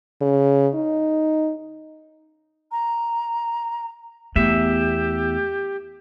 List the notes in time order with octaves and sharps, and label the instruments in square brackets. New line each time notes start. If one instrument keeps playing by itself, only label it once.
[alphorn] C#3
D#4
[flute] A#5
[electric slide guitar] E2 E5 [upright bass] A3 B3 [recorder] G4